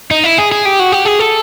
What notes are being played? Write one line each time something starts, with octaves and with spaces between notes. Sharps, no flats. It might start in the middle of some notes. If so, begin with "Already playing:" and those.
D#4
E4
G#4
G#4
G4
F#4
G4
G#4
A4